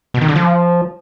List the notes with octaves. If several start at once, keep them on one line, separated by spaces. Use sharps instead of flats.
B2
D#3
D3
F3